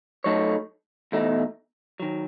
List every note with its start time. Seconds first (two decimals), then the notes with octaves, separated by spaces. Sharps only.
0.24 F#3 A3 D#4 A4 C#5
1.12 E2 B2 A3 D#4
2.00 D#3 F#3